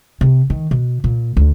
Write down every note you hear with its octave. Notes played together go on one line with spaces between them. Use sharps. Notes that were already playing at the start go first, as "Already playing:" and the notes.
C3
D#3
B2
A#2
D2